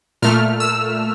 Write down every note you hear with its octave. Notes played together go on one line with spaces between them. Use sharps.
A#2 A3 F6
E6